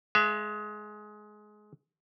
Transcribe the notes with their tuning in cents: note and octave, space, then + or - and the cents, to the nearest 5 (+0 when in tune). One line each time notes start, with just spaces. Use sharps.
G#3 +20 E5 +45